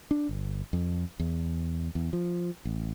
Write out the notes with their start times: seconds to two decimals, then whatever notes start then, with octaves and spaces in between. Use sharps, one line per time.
0.11 D4
0.29 G1
0.73 F2
1.20 E2
1.95 E2
2.13 F3
2.65 A1